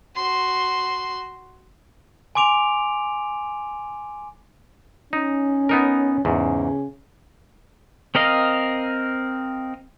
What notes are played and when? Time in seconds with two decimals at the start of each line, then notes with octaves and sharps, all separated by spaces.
0.15 F#4 C6
2.35 G#5 C6 D6 D7 F7
5.13 C#4 D#4
5.69 B3 D#4 A#4
6.25 E2 G#2 C#3
8.15 C4 A#4 D#5 F5